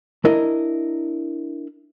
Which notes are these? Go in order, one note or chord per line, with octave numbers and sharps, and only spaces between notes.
D4 E4 A#4 D#5